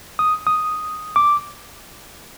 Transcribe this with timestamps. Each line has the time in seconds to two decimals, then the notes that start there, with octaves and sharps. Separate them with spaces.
0.19 D#6
0.47 D#6
1.16 D6